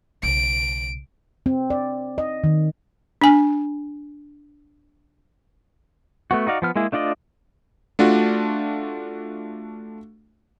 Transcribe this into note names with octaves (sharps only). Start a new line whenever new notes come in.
B1 C#3 D7
C4
D5
D#5
D#3
D4 G#5
A3 B3 F#4
D#4 F#4 D5 F5
F3 B3 F6
G#3 A#3 E4 G#4
A3 D4 F4 D5 D#5
A3 D4 F4 F#4